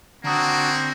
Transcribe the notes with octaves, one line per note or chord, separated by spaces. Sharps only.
D3 A#3 C4 D4 F#4 A#5 D#6